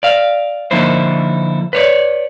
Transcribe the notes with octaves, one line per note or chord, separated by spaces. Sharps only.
D5 F5
D3 F3 A#3 D#4 E4 C5
B4 C#5 D5